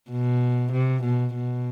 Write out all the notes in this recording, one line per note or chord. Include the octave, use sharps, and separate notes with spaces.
B2
C3
B2
B2